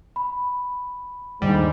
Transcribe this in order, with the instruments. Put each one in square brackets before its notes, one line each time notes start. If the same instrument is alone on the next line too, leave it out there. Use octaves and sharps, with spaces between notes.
[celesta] B5
[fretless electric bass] G1 D#2 D3 [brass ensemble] G#2 [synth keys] G3